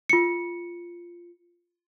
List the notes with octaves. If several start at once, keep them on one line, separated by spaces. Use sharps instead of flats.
F4 C#7